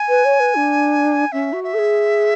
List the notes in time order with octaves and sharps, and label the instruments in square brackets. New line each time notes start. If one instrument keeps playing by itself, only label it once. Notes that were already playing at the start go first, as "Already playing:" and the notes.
Already playing: [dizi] G#5
[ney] B4
C#5
B4
D4
[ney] C#4 [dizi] E5
[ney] F#4
[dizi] E5
[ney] A4
G#4